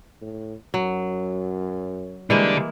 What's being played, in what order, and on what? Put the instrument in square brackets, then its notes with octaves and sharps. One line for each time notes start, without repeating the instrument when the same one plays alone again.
[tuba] A2
[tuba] F#2 [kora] F#3
[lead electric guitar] D3 D4 [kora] E3 G#3 A#3 [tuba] G3